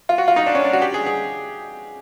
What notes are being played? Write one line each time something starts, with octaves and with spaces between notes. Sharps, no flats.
F4
F#4
F4
D#4
D4
C#4
D4
F#4
G4
G#4
G#4